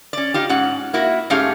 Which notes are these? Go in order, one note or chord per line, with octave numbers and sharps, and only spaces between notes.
C#4 D5
D#4 F4 G4
G#2 C#4 F#5
A#3 E4 F#4
G#2 A3 C#4 G4 G#4 F5